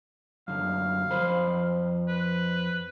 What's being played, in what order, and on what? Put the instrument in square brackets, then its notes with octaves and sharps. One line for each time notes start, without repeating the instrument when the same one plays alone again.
[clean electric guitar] F#2 D3 [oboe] F5
[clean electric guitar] F2 C5 B5
[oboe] B4